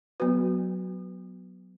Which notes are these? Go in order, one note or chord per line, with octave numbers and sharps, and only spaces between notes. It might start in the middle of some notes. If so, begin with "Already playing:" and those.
F#3 B3 F#4 B4